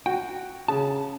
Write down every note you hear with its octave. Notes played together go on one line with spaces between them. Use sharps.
F#4 G5
C#3 A5